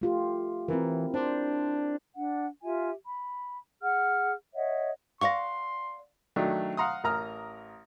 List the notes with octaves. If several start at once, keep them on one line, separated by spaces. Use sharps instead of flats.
A3 F4 G4
E3 C4 E4 A#4
D4 C5
D4 F#5
F4 G4 E5 G#5
B5
G#4 F#5 F6
C#5 D#5 E5 F#5
D5 F5 F#5 C6 C#6 A#6
D#3 F#3 A3 D4
F5 F#5 A#5 C6 D#6
A1 A#4 A#5 D#6 F6